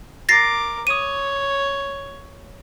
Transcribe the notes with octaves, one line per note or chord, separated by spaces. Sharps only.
A#4 D6 A6 A#6 C7
C#5 D#6 D#7